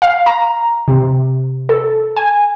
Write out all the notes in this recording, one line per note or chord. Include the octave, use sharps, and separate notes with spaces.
F5
A#5
C3
A4
G#5